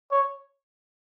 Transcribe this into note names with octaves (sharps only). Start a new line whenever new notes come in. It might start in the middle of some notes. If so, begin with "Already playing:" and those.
C#5